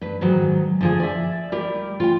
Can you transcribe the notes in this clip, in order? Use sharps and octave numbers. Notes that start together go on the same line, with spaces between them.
G2 B4
G#2 D#3 F#3 G#3
D3 F3 G#4
D5 E5
G3 G4 A#4
F4 F#5 G5